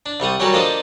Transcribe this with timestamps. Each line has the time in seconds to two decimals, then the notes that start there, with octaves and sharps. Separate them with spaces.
0.06 D4
0.20 C2 G3 C#6 D#6
0.40 F#3 G3 C#4 F#4 A4 A#4
0.53 F3 A#3 D4 A4 C5 D#5